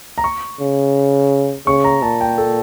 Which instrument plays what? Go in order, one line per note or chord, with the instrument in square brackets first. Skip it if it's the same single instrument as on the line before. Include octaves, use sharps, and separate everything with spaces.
[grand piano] A#5
C#6
[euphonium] C#3
[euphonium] C#3 [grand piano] C#6
[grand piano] A#5
[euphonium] A#2 [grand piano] A5
[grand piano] G5
A4